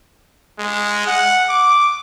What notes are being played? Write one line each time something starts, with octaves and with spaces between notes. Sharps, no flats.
G#3
F#5
D6